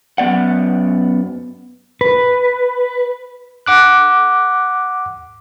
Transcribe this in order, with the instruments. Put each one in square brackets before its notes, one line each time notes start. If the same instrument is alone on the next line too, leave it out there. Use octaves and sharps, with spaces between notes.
[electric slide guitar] F#2 B3 D5 F#5
B4
[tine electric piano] F#5 D6 F#6